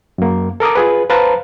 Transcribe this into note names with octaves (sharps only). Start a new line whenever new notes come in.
F#2 A#3
A4 A#4 D6 D#6
F4 G#4 B4
B4 C5 F5 A5 A#5